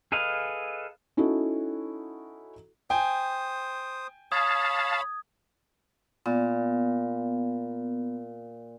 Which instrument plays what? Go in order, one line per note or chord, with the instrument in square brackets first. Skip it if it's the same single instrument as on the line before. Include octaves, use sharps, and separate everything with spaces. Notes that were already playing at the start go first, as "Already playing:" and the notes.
[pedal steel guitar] G#4 A4 B4 D#5 F5
[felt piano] C#4 D#4 E4 F#4 A4
[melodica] C5 D#6 [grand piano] G5 G#5
[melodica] C#5 B5 [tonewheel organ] F5 A5 [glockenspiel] D#6 G#6
[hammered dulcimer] A#2 [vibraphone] B3